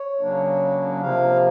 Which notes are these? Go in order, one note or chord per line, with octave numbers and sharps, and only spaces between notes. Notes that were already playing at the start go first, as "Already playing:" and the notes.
Already playing: C#5
C#3 F#3 A#3 D4
C3 F3 A#3 F5